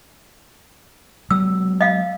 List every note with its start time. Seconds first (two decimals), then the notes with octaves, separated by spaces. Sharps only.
1.31 F#3 G#3 B3 E6
1.81 D#5 F5